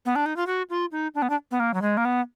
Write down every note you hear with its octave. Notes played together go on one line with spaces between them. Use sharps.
B3
D4
D#4
F4
F#4
F4
D#4
D4
B3
D4
B3
A#3
F#3
G#3
A#3
B3